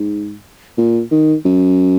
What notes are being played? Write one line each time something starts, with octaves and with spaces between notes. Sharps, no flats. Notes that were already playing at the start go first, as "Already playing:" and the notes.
Already playing: G#2
A#2
D#3
F#2